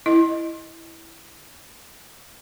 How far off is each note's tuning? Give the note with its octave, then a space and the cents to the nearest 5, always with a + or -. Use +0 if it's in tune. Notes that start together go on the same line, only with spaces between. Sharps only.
E4 +0 D#5 -5